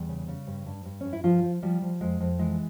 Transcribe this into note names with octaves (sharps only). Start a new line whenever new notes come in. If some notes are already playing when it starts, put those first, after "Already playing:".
Already playing: E2 G3
C#3
C#3
G2
G2
G2
G2 C#4
E4
G2 F3 F4
F3
F3 G3
F3
F2 G#3
F2
E3 G#3